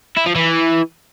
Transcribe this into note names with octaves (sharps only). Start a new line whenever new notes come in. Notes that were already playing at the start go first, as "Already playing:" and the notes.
E4
F3
E3